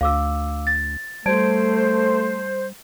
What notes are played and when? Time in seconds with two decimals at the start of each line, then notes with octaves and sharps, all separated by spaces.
0.01 D2 F5 D6 E6
0.67 A6
1.26 G3 A3 C5 A5 G#6 D7